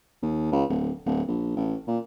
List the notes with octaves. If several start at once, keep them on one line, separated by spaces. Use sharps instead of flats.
D#2
C#2
D1
D1
A#1
A1
A#2